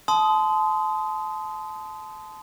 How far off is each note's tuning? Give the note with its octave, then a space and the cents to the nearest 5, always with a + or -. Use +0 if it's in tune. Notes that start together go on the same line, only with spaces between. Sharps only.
A5 -30 C6 -25 D#6 +10